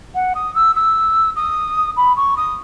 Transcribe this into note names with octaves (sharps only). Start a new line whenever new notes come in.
F#5
D#6
E6
E6
D#6
B5
C#6
D#6